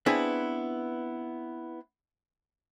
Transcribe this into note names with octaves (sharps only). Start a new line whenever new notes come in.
B3 C4 D4 E4 G#4 B4